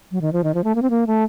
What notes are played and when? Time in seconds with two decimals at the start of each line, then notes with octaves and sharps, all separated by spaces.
0.12 F#3
0.21 D#3
0.33 F3
0.44 D#3
0.54 F3
0.64 A3
0.75 A#3
0.82 C4
0.90 A#3
1.07 A3